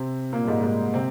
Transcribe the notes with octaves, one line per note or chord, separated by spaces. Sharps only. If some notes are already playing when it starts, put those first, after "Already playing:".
Already playing: C3 C4
A#2 A#3
G3
G#2 G#3
G#2 G#3
C3 C4